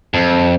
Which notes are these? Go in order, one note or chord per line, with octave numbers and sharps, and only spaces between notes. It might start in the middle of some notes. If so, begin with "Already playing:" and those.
F2